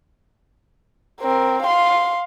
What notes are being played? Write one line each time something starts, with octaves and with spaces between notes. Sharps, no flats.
C4 A#4
F5 C6